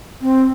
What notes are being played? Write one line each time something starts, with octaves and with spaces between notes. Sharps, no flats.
C4